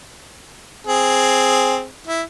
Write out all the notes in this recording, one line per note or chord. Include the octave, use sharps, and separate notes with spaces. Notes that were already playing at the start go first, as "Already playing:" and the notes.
C4 G#4
E4